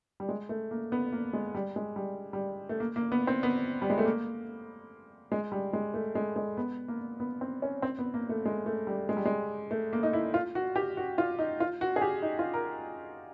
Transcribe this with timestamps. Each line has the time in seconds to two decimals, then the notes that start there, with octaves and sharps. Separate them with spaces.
0.20 G3
0.29 G#3
0.49 A3
0.71 A#3
0.92 B3
1.13 A#3
1.33 G#3
1.55 G3
1.76 G#3
1.96 G3
2.33 G3
2.69 A3
2.80 A#3
2.96 A#3
3.12 B3
3.27 C4
3.43 B3
3.82 G3
3.90 G#3
3.98 A3
4.06 A#3
5.32 G#3
5.52 G3
5.73 G#3
5.94 A3
6.15 G#3
6.36 G#3
6.57 B3
6.88 A#3
7.20 B3
7.41 C4
7.62 C#4
7.82 C4
7.99 B3
8.14 A#3
8.29 A3
8.45 G#3
8.66 A3
8.87 G3
9.09 G#3
9.17 G3
9.25 G#3
9.71 A3
9.93 A#3
10.03 D#4
10.13 E4
10.34 F4
10.55 F#4
10.76 G4
10.97 F#4
11.18 F4
11.39 D#4
11.60 F4
11.81 F#4
11.96 G#4
12.02 G4
12.22 D#4
12.39 F4
12.54 A#4